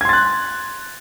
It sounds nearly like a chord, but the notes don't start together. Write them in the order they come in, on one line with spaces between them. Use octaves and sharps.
G#6 C6 A6 F#6